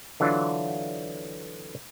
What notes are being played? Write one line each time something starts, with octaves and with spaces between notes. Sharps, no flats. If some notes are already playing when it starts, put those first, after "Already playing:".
D3 E3 F#3 D4 F4